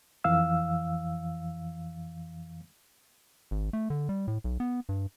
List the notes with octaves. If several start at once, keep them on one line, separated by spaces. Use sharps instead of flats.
F2 E3 F5 E6
G#1
A3
D3
G3
A2
B1
B3
G2